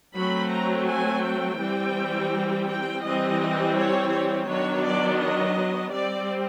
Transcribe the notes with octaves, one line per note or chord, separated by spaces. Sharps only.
F#3 A3 C4 B5
A#5
G#5
G5
E3 G3 C4
G5
E3 G3 C4 D#5
C#5
C#5
D#3 F#3 B3 D4 C#5
D5
D#5
G3 C4 D5